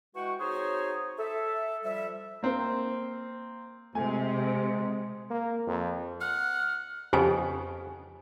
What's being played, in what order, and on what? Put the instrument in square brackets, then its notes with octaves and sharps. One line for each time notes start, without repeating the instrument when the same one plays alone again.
[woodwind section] E3 G#3 F#4 F#5 G5 C#6
C4 D#4 F#4 G#4 C5 C#5
A4 E5
F3 G3 E5
[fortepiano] A#3 C4
[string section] C3 [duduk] G#3 [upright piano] A3 G#5
[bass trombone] A#3
F2
[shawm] F#5 [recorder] F6
[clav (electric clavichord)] F2 C#3 B3 [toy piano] G4 G#5